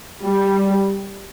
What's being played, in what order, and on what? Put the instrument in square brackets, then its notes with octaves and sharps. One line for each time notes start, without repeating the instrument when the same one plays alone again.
[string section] G3